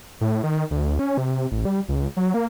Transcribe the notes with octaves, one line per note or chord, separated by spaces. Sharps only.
A2
D#3
D2
C#4
C3
A1
G3
C#2
F#3
A#3